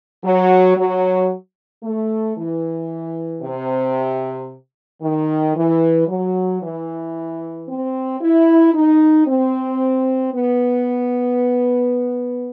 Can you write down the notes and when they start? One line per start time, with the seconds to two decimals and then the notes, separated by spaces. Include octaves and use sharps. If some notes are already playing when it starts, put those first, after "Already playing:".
0.24 F#3
0.76 F#3
1.83 A3
2.37 E3
3.42 C3
5.02 D#3
5.55 E3
6.08 F#3
6.61 E3
7.67 C4
8.21 E4
8.73 D#4
9.27 C4
10.33 B3